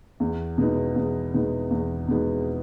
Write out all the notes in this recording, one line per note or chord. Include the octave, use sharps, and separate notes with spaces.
E2
B2 G#3 B3 D#4
E2
B2 G#3 B3 D#4
E2
B2 G#3 B3 D#4